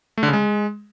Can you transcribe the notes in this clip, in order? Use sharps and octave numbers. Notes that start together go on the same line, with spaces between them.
A3
D3
C#3
G#3